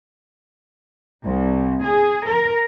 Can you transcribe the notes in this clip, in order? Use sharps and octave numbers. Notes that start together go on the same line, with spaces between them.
C2
G#4
A#4